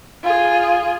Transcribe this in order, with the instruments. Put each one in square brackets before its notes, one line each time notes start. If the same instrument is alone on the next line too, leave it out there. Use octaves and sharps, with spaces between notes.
[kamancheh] F4 G#4